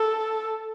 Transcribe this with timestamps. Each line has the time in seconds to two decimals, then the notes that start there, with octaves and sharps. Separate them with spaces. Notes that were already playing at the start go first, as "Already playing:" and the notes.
Already playing: A4